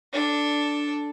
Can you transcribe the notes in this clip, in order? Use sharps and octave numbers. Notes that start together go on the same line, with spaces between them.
D4 A4